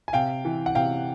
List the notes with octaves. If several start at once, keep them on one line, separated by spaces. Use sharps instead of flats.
G#5
C3 F5 G5
E3
F#5
C3 F5 G5